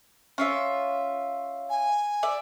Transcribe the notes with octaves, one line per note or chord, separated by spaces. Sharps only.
C#4 F4 E5
G#5
D5 E5